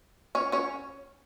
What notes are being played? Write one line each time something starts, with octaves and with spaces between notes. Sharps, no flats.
C#4 C#5
C#4 C#5